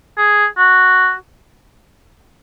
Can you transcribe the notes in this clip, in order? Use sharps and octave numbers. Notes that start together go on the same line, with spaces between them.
G#4
F#4